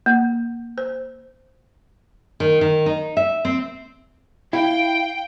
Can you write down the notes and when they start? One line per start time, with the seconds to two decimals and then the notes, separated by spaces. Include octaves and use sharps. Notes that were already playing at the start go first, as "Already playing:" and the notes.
0.06 A#3
0.78 C5
2.40 D#3
2.61 D#3
2.86 D#4
3.17 E5
3.45 C4
4.53 E4 F5 G5